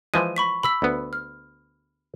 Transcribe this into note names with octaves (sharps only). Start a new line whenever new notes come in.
E3 F3 G#3 D#7
B5 C#6 B6
B5 E6 B6
D2 B3
F6